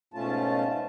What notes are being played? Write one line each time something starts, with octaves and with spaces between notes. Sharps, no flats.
G#2 B2 A3 C#4 F4 A5